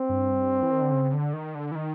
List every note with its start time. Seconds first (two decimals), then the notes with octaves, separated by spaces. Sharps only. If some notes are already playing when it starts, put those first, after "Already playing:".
Already playing: C4
0.09 G2
0.62 E3
0.72 D#3
0.82 D3
0.92 C#3
1.13 D3
1.33 D#3
1.55 D3
1.72 E3
1.75 D#3